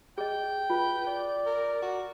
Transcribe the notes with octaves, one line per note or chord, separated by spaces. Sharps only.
G#4 D#5 G5
F4 B4
D5
A#4
F#4